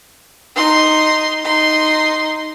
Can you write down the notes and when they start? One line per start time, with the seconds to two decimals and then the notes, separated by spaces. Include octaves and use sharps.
0.55 D#4 C6
1.44 D#4 C6